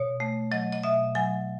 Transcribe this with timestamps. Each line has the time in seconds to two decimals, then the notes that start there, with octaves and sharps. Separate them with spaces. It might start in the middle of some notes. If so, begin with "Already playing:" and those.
Already playing: B2 C#5
0.20 A3
0.52 F#3 D#5
0.72 D#5
0.83 B2 E5
1.15 F#3 G#5